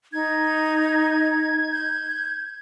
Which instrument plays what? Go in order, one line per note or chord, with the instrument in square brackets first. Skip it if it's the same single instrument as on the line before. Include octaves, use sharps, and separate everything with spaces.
[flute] D#4 [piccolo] G#6
[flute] G6